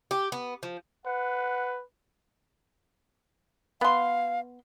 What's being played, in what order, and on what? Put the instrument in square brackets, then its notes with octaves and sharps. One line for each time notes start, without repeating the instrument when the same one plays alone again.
[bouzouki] G4
B3
F3
[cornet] B4 [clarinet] F#5
[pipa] B3 C6 [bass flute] F5